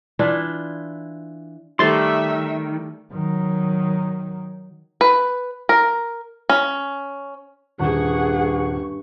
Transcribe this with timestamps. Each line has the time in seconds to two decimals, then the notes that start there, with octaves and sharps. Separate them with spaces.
0.19 E3 D4 E4 F4
1.79 D#3 G3 A3 E5 C6 A6
3.13 D#3 F#3
5.01 B4
5.69 A#4
6.49 C#4
7.79 D#1 G2 G#4 F#5 C#6